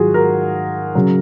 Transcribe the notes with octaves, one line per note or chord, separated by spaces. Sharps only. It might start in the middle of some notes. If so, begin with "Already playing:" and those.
Already playing: G#2 D#3 F#3 F4 F#4 G#4
A#4
C#3 F#3